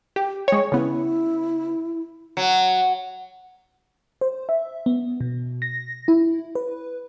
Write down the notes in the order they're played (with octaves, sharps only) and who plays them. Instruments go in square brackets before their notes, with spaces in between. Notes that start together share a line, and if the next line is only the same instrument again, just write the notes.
[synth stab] G4
[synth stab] G#3 C#5 [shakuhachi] G5
[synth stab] C#3 B3 [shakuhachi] E4
[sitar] F#3
[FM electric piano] C5
E5
B3
B2
A#6
E4
B4